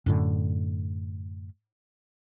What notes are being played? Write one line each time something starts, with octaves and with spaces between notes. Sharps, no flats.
F#2 A2 D3